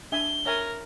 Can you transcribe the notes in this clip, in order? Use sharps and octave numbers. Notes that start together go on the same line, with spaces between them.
D4 E5 G#5 G7
A#4 C#5 E5 G#5